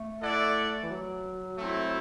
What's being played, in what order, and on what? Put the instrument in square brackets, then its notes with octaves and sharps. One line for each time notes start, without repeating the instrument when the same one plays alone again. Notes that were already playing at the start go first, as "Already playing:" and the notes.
Already playing: [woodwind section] A3
[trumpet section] E4 A4 D5 F#5
[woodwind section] E3
F#3
[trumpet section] A3 C4 E4